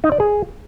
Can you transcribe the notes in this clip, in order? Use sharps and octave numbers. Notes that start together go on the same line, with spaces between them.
D#4
D5
G#4